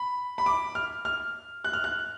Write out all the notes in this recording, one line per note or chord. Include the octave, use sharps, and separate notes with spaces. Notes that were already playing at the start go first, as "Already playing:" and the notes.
Already playing: B5
B5
D6
F6
F6
F#6
F6
F#6